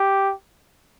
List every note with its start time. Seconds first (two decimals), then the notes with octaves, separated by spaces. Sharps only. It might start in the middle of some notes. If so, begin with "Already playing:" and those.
Already playing: G4